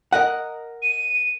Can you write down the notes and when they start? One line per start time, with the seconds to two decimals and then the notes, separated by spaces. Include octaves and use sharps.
0.13 A#4 D#5 F#5
0.82 D#7